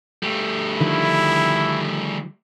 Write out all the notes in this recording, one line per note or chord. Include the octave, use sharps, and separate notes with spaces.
G3 A3
D3 D#3 F3 E4